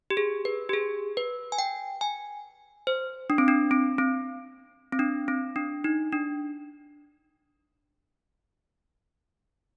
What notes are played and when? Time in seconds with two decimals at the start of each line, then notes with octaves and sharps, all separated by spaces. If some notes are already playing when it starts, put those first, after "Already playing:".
0.10 G4
0.17 G#4
0.45 B4
0.69 G4
0.73 G#4
1.17 B4
1.52 G#5
1.58 G5
2.01 G#5
2.87 C5
3.30 D4
3.38 C4
3.48 D4
3.71 C4
3.98 C4
4.93 C4
4.99 D4
5.28 C4
5.56 D4
5.84 D#4
6.12 D4